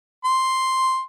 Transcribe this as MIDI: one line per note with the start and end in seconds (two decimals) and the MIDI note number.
0.24 1.01 84